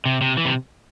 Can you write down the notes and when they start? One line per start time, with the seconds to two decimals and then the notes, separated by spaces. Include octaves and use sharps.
0.05 C3
0.21 C3
0.37 E3
0.45 C3